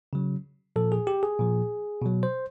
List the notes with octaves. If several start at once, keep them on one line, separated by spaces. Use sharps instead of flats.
C#3 F#3
A#2 F3 A4
G#4
G4
G#4
A#2 F3
B2 F#3
C5